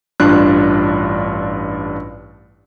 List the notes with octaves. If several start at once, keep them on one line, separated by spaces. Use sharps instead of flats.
A1 G2 D4 F4 F#6